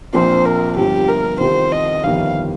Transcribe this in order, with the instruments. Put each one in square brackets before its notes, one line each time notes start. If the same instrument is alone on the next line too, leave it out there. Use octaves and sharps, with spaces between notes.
[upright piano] A#1 A#2 F3 C4 [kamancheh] C5
[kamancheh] A#4
[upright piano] G1 G2 F3 [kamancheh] G4
[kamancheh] A#4
[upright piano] C2 C3 D#3 C4 F4 [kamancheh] C5
[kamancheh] D#5
[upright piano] G1 F2 C3 D#3 [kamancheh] F5